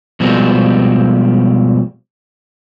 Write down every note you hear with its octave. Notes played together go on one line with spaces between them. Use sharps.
B2 F3 G3 G#3 C4